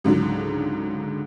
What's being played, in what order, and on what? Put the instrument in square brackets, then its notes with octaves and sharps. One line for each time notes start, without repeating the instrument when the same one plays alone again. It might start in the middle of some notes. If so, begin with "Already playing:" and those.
[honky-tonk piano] C#2 G#2 D3 F#3